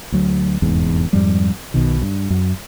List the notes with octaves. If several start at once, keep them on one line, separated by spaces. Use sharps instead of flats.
D2 F#3
F1 E2 G#2
F2 G#2 F3 G3
B1 B2 D#3
G2
F#2